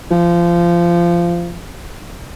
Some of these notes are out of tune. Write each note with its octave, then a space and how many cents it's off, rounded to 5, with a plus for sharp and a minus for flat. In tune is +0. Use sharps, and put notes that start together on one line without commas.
F3 -20